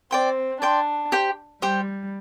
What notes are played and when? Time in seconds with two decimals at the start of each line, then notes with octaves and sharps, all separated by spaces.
0.11 C4 D5 G5 C6
0.61 D4 D5 G5 C6
1.12 G4 C5 G5
1.62 G3 G4 C5 G5